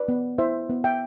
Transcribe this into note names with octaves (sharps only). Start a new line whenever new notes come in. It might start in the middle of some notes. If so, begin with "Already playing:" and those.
Already playing: B4 D5
B3
E4 C5 E5
B3
E5 G5